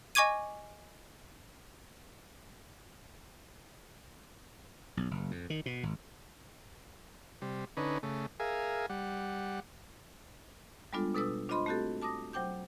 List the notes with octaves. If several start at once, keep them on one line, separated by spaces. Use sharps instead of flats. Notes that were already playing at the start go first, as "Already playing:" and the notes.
D#5 G#5 C#6 D6 G#6 D#7
B1
F#1
F2
D#3
B2
G#1
C3 G3
D3 C#4 D#4 B4
C#3 A3
G#4 A#4 E5 F5 G#5
G3 F#5
G3 G#3 B3 D4 F4 A4
B2 D4 A4 B4 D#6 E6
D4 F4 C5 D#5 B5 C6
A3 C4 F#4 G4 A4
A5 D6 D#6 A#6
F#3 C5 G5 D6 G6